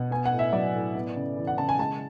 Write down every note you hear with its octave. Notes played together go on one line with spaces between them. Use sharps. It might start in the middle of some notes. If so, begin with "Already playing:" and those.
Already playing: B2 F#5
B3 G#5
F#5
A2
E5
F#3 D5
A2
B3
C#3
E3
F#5
C#3 A5
G#5
G#3 A5